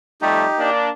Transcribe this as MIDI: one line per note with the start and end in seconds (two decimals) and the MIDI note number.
0.21 0.46 41
0.21 0.46 55
0.21 0.46 57
0.21 0.70 63
0.21 0.70 67
0.59 0.90 58
0.59 0.90 62